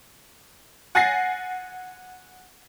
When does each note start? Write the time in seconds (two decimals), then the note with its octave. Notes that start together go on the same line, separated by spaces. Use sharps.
0.95 F#5 G#5 A6 A#6 C7